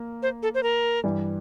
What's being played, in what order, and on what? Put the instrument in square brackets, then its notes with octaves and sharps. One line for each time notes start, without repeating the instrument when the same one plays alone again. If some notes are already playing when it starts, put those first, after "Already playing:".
Already playing: [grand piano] A#3
[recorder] C5
A4
C5
A#4
[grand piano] G2 E3 G3